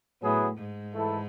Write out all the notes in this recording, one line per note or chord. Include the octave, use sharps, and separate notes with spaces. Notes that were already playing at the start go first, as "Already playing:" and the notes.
A2 F#3 B3 E4 G#4
G#2
E3 A3 E4 A4